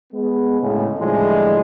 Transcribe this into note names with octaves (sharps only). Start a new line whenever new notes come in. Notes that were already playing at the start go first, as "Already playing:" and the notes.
G#3 B3
D2 A2 C#3 G#3
A2 D3 E3 F3 G3 G#3